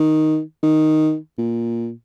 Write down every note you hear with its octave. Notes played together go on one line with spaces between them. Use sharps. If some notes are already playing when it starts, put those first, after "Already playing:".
Already playing: D#3
D#3
A#2